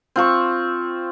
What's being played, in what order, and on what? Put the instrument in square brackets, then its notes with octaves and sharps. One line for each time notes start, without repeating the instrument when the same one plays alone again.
[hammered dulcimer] C4 F4 C#6